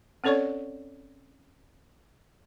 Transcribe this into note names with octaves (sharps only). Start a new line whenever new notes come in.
C4 C#4 A4 C#5 D5 C#6